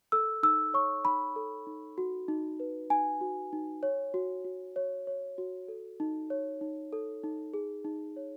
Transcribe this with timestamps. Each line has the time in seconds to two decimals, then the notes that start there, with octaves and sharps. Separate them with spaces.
0.12 A4 E6
0.43 D#4 E6
0.74 C#5 C#6
1.05 D#4 B5
1.36 A4
1.67 D#4
1.98 F#4
2.28 D#4
2.60 B4
2.90 D#4 G#5
3.21 F#4
3.53 D#4
3.83 C#5
4.14 F#4
4.45 F#4
4.76 C#5
5.07 C#5
5.38 F#4
5.68 A4
6.00 D#4
6.30 C#5
6.61 D#4
6.93 A4
7.24 D#4
7.54 G#4
7.85 D#4
8.16 C#5